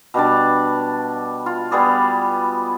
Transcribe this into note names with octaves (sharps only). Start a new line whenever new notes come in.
B2 G3 D4 D5
F4
G3 B3 G#4 D5